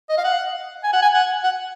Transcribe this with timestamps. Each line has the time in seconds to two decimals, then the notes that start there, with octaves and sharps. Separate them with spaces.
0.10 D#5
0.18 F5
0.25 F#5
0.84 G#5
0.93 F#5
1.03 G#5
1.14 F#5
1.44 F#5